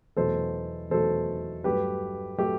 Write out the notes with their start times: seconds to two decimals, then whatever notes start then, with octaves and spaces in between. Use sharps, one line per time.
0.17 E2 B2 F#3 A3 A4 C5
0.90 E2 B2 F#3 A3 A4 C5
1.64 G2 F#3 A3 G4 B4
2.38 F#3 A3 G4